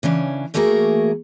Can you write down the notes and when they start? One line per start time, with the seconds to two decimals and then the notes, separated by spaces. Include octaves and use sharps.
0.03 C#3 E3 C#4 D4
0.54 E3 A3 A#3 F#4 G#4 A#4